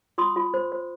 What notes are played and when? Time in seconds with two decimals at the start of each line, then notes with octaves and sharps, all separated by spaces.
0.18 F4 C6 D#6
0.36 F4
0.54 C5
0.72 C5